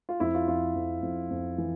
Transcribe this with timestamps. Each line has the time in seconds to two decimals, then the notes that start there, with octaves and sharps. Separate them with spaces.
0.09 F4
0.20 F2 E4
0.35 F4
0.48 F2 F4
0.75 F2
1.02 F2
1.30 F2
1.58 E3